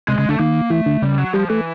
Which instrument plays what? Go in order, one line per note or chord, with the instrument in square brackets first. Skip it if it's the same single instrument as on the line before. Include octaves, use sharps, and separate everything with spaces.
[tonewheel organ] C3 [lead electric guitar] G#3
[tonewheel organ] C#3 [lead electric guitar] G#3
[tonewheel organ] D3 [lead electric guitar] A3
[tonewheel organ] D#3 [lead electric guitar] A#3
[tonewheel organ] E3 [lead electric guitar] A3
[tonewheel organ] D3
[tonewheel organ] C#3 [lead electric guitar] G3
[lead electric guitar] F#3
[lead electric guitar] F3 [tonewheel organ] G3
[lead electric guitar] E3 [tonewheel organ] A3